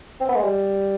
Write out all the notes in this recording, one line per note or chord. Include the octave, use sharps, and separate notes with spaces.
C4
B3
G#3
G3